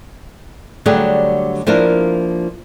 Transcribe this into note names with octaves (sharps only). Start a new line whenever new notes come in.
D3 F#3 G3 A3 G4 G#4
F3 A#3 D4 E4 A#4